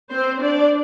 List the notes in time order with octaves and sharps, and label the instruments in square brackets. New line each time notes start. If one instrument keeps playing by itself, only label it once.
[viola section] C4 C5
D4 D5